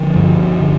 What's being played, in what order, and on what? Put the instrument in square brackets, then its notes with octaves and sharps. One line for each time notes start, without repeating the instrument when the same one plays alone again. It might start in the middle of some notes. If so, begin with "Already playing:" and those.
Already playing: [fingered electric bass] D3 F3
G2
D3